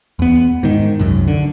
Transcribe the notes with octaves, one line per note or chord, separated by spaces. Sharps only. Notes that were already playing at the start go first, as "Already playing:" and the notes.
E2 B3
G#2 D#3
C2 F#2
D3